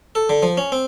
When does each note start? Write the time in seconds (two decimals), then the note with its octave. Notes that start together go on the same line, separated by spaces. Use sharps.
0.15 A4
0.30 D3
0.43 F3
0.57 C#4
0.72 C4